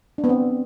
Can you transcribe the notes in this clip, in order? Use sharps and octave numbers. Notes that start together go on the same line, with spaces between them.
D4
B3
C4